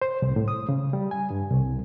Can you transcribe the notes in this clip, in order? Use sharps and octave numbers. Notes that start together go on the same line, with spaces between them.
C5
C2
A2
D#6
C#3
G3
G#5
G2
C2